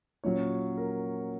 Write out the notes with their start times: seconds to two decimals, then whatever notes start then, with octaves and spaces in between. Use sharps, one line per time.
0.24 A#2 F#3 C#4 C#5
0.77 A#4